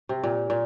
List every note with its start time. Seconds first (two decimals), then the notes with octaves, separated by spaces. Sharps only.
0.09 C3
0.24 A#2
0.50 A#2